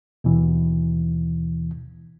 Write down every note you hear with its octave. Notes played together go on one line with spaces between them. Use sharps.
D#2 B2 E3